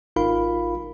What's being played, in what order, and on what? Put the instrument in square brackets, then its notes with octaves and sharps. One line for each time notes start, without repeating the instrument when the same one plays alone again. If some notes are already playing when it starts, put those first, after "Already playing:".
[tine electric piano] G#1 D#4 F4 A#4 F5 B5